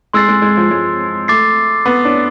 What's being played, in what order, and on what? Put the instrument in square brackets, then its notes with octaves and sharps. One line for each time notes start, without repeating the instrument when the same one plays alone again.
[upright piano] G#3 [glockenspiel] C6 E6 A6 C7
[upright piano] G#3
G#3
F3
G#3
[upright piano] A3 [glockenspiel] D6 A6 C7
[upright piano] B3
D4